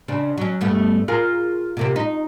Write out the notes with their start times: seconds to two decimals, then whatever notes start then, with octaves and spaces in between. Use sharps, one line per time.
0.08 C#3 C4 D4
0.38 F#3 C#4
0.61 G2 A3 B3
1.08 F4 G#4 A#4
1.77 C3 A#3 C4
1.96 D#4